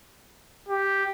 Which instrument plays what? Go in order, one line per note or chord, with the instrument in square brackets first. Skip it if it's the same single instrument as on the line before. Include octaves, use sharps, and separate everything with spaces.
[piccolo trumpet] G4